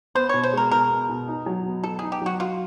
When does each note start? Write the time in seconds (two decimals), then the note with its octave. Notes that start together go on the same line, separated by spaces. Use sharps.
0.15 B3 C5
0.29 B2 C#5
0.43 C5
0.53 G#3 A#4
0.71 B2 A#4
0.90 B3
1.09 B2
1.28 D#4
1.46 F#3
1.66 B3
1.83 F#3 A4
1.99 D#4 G#4
2.12 G4
2.22 F#3 F#4
2.40 F4 F#4